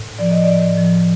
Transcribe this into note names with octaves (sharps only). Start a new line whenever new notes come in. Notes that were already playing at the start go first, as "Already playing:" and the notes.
Already playing: A2
F3 D5
D#5
A2 D5
F3